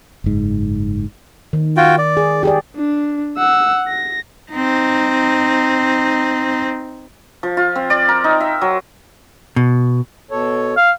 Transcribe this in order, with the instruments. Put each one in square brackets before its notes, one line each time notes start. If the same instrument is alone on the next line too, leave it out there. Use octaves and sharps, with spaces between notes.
[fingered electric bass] F#1 G#2
[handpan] D#3
[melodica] F4 F#4 G5
D5
[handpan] G#4
G4 G#4 D5
[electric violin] D4
F#5 E6
A#6
[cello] C4 D#4
[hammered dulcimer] F3
F4
C4
D5
A#4
D#4
E5
F#3
[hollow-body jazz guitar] B2
[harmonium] B2 A4 C#5
[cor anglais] F5